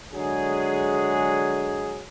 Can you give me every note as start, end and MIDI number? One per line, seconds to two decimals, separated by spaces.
0.13 2.03 50
0.13 2.03 54
0.13 2.03 56
0.13 2.03 68